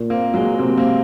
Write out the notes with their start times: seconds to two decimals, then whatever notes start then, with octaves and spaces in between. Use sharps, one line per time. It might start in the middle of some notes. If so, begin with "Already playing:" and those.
Already playing: A#2
0.10 A#3 C4
0.34 F#3 G#3
0.59 C3 A#3 C4
0.78 A#3 C4